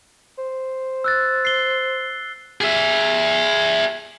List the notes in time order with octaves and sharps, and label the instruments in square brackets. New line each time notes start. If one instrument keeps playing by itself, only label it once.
[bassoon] C5
[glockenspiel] E6 F#6 A6
C7 G7
[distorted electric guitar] G#4 E5